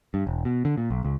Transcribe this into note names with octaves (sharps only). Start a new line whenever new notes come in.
G2
E1
B2
D3
A#2
B1
C#2